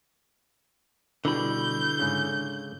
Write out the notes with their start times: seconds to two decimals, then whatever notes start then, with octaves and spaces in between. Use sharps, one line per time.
1.25 B2 D3 G3 E4 B5 G6
1.99 G#2 C#3